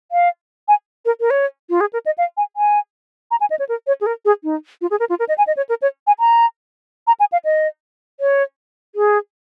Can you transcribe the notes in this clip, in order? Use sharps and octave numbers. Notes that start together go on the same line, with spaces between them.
F5
G#5
A#4
A#4
C#5
F4
G#4
A#4
D#5
F5
G#5
G#5
A#5
G#5
D#5
C#5
A#4
C#5
G#4
A#4
G#4
D#4
F4
G#4
A#4
F4
A#4
D#5
G#5
D#5
C#5
A#4
C#5
G#5
A#5
A#5
G#5
F5
D#5
C#5
G#4